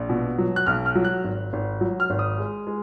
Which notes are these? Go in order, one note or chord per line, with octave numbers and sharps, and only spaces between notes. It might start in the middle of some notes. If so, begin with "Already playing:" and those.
Already playing: A#1
B2
F#3
F#6
B1 F6
F6
F#3
F#6
G#1
G#1
F#3
F6
G#1
D#6
G#3
G#3